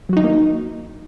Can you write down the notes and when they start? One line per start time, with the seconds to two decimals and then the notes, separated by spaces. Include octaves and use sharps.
0.09 F#3
0.13 F#4
0.17 D#4
0.20 D#3
0.24 A#3